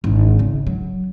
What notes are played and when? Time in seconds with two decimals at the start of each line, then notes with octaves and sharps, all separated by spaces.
0.04 G#1 D3
0.39 C#3
0.67 F#3